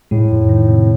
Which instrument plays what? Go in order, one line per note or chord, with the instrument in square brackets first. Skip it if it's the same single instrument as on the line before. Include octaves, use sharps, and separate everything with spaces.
[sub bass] A2 [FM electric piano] G#3
[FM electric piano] F2
D#3
C3